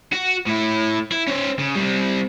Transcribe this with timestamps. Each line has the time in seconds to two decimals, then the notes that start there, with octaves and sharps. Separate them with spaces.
0.12 F#4
0.47 A2 E4
1.12 E4
1.27 C#4 C5
1.59 C#3
1.76 G3 C4